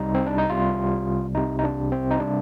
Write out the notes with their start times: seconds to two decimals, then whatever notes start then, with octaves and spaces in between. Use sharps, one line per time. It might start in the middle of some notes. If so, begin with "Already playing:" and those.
Already playing: C2 C3 G3 D#4
0.14 C4
0.26 D4
0.38 D#4
0.49 C2 C3 G3 F4
1.35 C2 C3 G3 D#4
1.59 D#4
1.64 D4
1.92 C4
2.11 D#4
2.19 C3 G3 D4